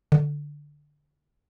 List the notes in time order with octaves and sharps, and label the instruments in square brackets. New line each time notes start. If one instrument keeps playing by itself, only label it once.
[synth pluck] D3